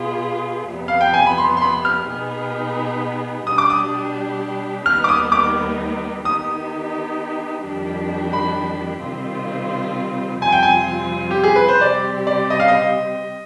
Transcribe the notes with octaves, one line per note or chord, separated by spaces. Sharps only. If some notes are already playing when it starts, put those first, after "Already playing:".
Already playing: B2 B3 F4 G#4
F2 C3 G3 B3
F5
G5
G#5
B5
C6
C6
B5
F6
B2 B3 D#4 G#4
B2 G3 D4 G4 D#6
D6
D#6
D#2 D#3 G3 B3 D#4 F6
D6
D#6
D6
D#3 B3 D#4 G4 D#6
F2 D#3 G3 D4 G4
B5
C3 D#3 G3 C4 F4
F2 C3 G3 C4 F4 G#5
G5
G#5
G4
G#4
B4
C5
C3 G3 C4 G4 D5
D5
D#5
F5
D#5